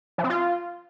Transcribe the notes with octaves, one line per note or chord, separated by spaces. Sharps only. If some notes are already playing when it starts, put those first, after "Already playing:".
F3
C4
F4